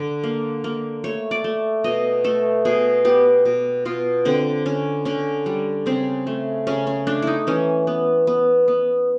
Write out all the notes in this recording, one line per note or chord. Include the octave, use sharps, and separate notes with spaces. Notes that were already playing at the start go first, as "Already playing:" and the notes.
Already playing: D3
A#3
A#3
A3 C#5
D5
A3
B2 D#5
A3 A4
B2 G#4
B3 G4
B2
B2 F4
D3 C4
D3 C#4
D3 C#4
G3
C#3 C4
A3
C#3 C#4
C#4
A3 D4
D#4 E4
E3 C#4
B3
B3
B3